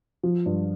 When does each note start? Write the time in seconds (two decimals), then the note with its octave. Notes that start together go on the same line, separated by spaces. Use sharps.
0.23 F3
0.46 G2